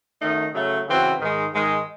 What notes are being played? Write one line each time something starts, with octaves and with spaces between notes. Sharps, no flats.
F#2 D#3 A3 D#4
C#3 F#3 A3
C#3 E3 C4 F#4
G#2 D#3 G#3
G#2 D#3 G#3